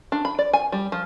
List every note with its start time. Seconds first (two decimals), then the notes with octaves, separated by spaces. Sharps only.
0.12 D4
0.25 B5
0.39 D5
0.53 G#5
0.72 G3
0.92 F3